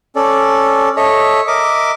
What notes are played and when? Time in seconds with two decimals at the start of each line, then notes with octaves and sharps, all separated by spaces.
0.16 C#4 A4 D5
0.97 A4 C#5 D#5 E5
1.47 A#4 D#5 E5 D6